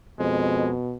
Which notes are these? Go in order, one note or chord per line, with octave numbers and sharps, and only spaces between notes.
F2 B2 G#3